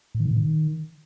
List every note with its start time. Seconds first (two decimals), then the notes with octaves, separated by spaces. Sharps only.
0.15 A2
0.20 D#3
0.25 C3
0.31 A2
0.36 D#3